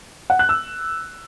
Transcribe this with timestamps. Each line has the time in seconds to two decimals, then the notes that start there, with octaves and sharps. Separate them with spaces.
0.30 F#5
0.39 F#6
0.49 E6